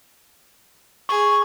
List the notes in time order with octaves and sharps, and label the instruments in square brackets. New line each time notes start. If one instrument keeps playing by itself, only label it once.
[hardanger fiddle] G#4 [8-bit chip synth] C#6